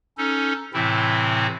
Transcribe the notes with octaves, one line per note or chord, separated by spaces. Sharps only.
C#4 D#4 A4
A2 C3 E3 C4 E4